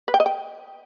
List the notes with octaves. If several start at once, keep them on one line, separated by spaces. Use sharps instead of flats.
B4
G5
D#5
G5